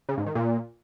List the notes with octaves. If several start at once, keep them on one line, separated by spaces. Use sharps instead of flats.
C#3
G#2
D#3
A#2